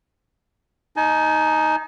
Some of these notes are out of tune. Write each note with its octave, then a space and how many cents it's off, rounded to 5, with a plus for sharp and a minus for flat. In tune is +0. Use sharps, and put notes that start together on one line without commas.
D#4 +0 G#5 +40